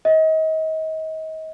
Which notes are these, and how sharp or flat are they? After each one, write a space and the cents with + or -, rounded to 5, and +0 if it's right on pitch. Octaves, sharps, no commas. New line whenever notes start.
D#5 +30